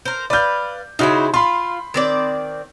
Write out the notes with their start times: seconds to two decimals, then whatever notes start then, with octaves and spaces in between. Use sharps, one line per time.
0.05 A#4 C5
0.30 B4 D5 F5 G6
0.99 C#3 D#4 E4 F#4 C5 E5
1.34 F4 B5 C6
1.94 D#3 C4 D5